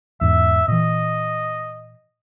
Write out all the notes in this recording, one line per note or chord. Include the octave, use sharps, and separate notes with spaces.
E2 G#2 E5
A#2 E3 D#5